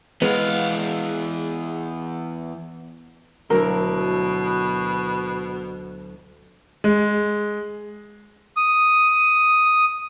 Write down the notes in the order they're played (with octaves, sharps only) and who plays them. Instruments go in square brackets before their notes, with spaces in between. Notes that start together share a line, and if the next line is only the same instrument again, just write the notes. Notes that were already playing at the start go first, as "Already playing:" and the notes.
[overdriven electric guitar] E2 F5 [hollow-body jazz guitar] G#3 B3
[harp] D2 F#3 E4 [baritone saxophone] B2 [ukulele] A#4
[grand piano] G#3
[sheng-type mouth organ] D#6